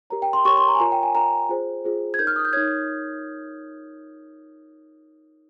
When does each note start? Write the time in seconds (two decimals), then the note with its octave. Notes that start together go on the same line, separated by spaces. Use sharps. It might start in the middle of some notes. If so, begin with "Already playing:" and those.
0.10 G4 A#4 C#5 A#5
0.22 G5
0.33 C6
0.45 G4 A#4 C#5 C#6
0.57 C6
0.68 A#5
0.75 G#5
0.80 F4 A#4 C#5 A#5
0.92 G5
1.03 G#5
1.15 F4 A#4 C#5 A#5
1.49 F4 G#4 C5
1.84 F4 G#4 C5
2.14 G#6
2.19 D#4 A#4 C#5 G6
2.27 F6
2.36 D#6
2.45 G6
2.53 D#4 A#4 C#5 G#6